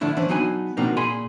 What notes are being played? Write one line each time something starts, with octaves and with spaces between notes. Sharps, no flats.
D3 F3 A3 D4 E4
E3 C#4 D4 C5
F#3 B3 D4 D#4 G#5 B5
B2 F3 A#3 C4 D4 D#4
A#2 G#4 G#5 B5 C6